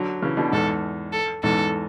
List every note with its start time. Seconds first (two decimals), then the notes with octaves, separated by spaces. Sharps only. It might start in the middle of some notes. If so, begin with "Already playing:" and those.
Already playing: D3 F#3
0.22 C#3 E3
0.37 B2 D3
0.52 E2 G#2 A4
1.12 A4
1.43 E2 G#2 A4